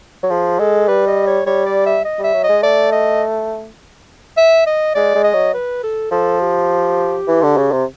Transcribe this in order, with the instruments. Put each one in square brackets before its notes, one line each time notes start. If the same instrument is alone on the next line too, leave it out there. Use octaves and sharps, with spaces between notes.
[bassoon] F#3
[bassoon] F3 [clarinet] G#4
[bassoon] G#3 [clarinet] A4
[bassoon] G3 [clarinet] B4
[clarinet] D#5
C#5
[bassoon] G3 [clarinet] C#5
[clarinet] D5
E5
D#5
[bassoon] G3 [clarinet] E5
[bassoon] F#3
[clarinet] D#5
[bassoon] G#3
[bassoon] A3 [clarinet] D5
[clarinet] D#5
E5
D#5
[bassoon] G#3 [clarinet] D5
[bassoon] G#3
[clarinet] D#5
[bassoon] F#3
[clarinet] B4
A4
[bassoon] F3 [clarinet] A4
[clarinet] G4
[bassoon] E3
D3
C#3
C3